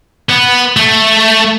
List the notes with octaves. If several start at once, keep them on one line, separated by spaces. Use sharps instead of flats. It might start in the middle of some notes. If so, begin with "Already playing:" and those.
B3
A3